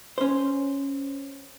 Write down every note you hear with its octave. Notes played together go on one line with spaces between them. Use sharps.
C#4 C5